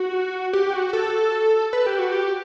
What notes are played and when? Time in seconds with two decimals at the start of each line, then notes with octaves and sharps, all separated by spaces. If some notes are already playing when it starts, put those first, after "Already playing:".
Already playing: F#4
0.53 G4
0.73 F#4
0.93 A4
1.73 B4
1.86 G4
1.99 F#4
2.12 G4